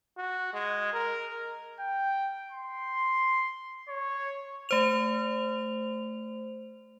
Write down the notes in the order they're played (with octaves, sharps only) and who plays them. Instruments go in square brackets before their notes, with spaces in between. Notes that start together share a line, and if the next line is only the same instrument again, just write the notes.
[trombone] F#4
G#3
A#4
[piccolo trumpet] G5
C6
C#5
[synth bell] A3 C5 F7